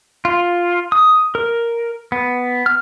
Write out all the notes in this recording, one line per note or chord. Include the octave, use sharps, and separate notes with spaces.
F4
D#6
A#4
B3
F6